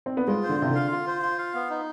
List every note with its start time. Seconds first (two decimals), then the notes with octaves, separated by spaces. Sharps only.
0.06 C4
0.17 B3
0.28 G#3 F4
0.43 C5
0.49 D3
0.60 C3 F4
0.70 D3 F5
0.92 F4
1.07 C5
1.22 F4
1.38 F5
1.54 B3
1.70 D#4